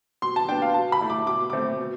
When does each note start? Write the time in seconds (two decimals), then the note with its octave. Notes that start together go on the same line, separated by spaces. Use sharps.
0.22 B2 C6
0.36 A5
0.48 B3 D4 G5
0.62 F5
0.74 B2 A5
0.92 B5
1.01 A3 E4
1.10 D6
1.26 B2 D6
1.50 A3 C4 D6
1.80 B2